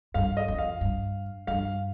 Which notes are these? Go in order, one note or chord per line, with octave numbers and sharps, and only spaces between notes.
G2 F5
D#5
F2
F5
G2
G2 F5